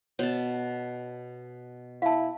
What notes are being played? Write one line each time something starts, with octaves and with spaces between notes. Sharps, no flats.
B2 C#5 A5
E4 F5 A5